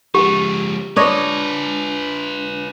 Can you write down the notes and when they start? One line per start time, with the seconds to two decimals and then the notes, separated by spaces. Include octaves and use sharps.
0.15 F3 G#3 G4
0.96 D4 F4 B4 C#5 D#5